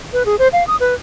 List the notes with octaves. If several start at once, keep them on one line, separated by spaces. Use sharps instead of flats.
B4
G#4
C5
F5
D#6
B4